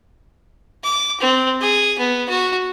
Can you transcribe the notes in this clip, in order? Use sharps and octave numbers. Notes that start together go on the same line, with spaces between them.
D6
C4
G#4
B3
F#4